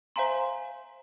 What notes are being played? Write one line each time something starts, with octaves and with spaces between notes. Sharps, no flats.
C5 E5 F5 G#5 A#5 C6